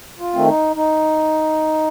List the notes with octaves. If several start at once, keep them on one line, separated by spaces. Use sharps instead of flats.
F4
D#3 A3 C4
D#4
D#4